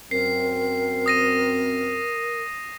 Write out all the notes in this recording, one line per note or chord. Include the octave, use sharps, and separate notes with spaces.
F#2 C4 A#4 C7
D#6 A#6 D#7